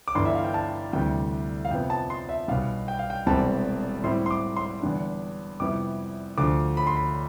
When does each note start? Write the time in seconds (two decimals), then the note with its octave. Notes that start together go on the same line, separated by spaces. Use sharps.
0.08 D6
0.15 G1 G2 E3 C6
0.25 E5
0.35 F5
0.44 G5
0.54 A5
0.93 D2 C3 E3 G3 G5
1.65 F5
1.71 F2 C3 F3 B3 G5
1.90 A5
2.10 C6
2.29 E5
2.48 B1 B2 G3 F5
2.88 G5
2.99 F5
3.10 G5
3.26 E1 E2 C3 G3 C4 A5
4.04 A2 G3 C4 E4 C6
4.26 C6
4.31 D6
4.56 C6
4.82 E2 D3 G3 D4
5.60 F2 C3 G3 B3 E4 D6
6.38 D2 D3 F3 D6
6.77 B5
6.87 C6
6.97 B5